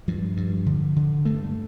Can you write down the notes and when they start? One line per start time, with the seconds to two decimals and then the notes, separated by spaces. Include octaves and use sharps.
0.08 G2 F3
0.37 G2
0.66 D3
0.96 D3
1.25 G2 A3